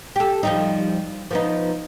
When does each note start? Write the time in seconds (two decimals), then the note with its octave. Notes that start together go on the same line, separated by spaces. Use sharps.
0.16 G4 A4
0.43 F3 G3 D#4
1.31 F3 B3 D#4